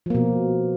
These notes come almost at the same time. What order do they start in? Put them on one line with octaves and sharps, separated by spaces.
F3 A#3 B2